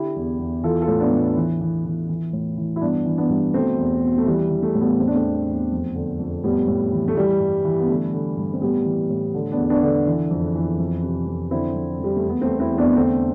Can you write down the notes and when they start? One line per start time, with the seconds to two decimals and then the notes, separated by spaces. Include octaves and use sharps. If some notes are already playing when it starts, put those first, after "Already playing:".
Already playing: D3 E4 G4
0.16 E2
0.39 E2
0.64 E3 F4 A4
0.82 F4 A4
0.88 A2
1.00 B3 D4
1.12 A2
1.37 E3
1.61 E3
1.85 E3
2.09 E3
2.33 A2
2.58 E3
2.76 E4
2.81 G2 B3 D4
3.06 E3
3.18 B3 D4
3.29 G2
3.53 B2 A3 C4
3.78 E2
4.02 B2
4.18 A3
4.26 E3 G3
4.51 E3
4.63 A3
4.75 A2
4.81 G3 B3
4.99 E2 C4
5.07 D4
5.14 A3 C4
5.22 E2
5.47 E2
5.71 F2
5.95 D3
6.19 F2
6.43 A2 G3 B3
6.67 A2
6.92 E3
7.08 A3
7.16 E3 G3
7.40 G2
7.65 E3
7.80 B3
7.88 D3 A3
8.13 D3
8.37 G2
8.53 C4
8.61 A2 G3 B3
8.85 E3
9.10 A2
9.34 D3
9.51 B3 D4
9.58 E2
9.70 B3 D4
9.83 D3
10.07 E3
10.30 F2
10.55 E3
10.78 F2
11.03 C3
11.27 F2
11.51 D3 C4 E4
11.75 F2
11.99 F2 G3
12.16 A3
12.23 E2
12.29 B3
12.41 A3 C4
12.48 E2
12.60 C4 E4
12.72 E2
12.78 B3 D4
12.96 D3 A3 C4